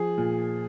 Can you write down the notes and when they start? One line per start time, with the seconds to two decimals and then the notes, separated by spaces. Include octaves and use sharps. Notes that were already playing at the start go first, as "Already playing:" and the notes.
Already playing: F3 G#4
0.18 A#2